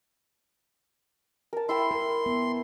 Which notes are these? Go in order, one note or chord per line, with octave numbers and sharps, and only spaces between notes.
A#4 A5
E4 E5 G5 C6
A#4
B3